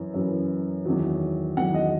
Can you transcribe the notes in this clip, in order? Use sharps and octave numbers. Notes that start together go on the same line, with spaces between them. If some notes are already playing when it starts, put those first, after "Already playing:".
Already playing: F#2 E3
F#2 E3
E2 D#3 F#3
E2 D#3 F#3 F#5
D#5